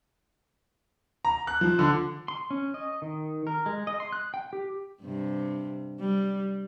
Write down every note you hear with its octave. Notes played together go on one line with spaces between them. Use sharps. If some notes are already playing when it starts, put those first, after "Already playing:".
A#5
F#6
F3
D3
C6
C#4
D#5
D#3
A#4
G#3
D#5
C6
F#6
G5
G4
G2 C3
G3